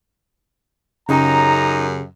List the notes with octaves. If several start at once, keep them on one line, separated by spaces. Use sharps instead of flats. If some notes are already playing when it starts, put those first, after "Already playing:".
F#2 C#3 D#4 G4 G#4 A#5